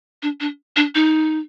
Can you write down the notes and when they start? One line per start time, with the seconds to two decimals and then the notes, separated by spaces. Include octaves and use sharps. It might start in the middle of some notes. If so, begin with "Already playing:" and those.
0.22 D4
0.40 D4
0.76 D4
0.95 D#4